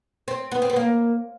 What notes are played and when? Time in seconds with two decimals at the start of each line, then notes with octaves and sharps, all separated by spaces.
0.28 C4
0.51 B3
0.62 C4
0.70 B3
0.76 A#3